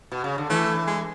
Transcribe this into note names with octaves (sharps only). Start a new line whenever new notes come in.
B2
C#3
D3
E3 A3
G#3